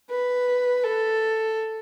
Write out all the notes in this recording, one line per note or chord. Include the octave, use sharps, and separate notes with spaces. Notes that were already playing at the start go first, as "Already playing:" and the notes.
B4
A4